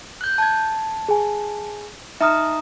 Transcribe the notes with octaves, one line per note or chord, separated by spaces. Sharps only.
F#6 G6
A5 G#6
G#4 G#5
D#4 E5 A#5 D#6 F6